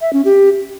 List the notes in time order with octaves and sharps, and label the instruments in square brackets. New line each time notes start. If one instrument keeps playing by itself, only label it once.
[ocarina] E5
C#4
G4